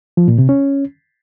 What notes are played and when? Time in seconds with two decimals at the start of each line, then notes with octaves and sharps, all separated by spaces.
0.17 F3
0.28 A#2
0.38 C3
0.49 C#4